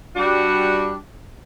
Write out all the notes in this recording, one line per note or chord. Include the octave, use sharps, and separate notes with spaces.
G3 D4 F#4